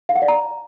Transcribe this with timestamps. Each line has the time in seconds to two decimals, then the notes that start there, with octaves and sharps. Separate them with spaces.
0.09 F5
0.16 F#5
0.22 D5
0.28 A#5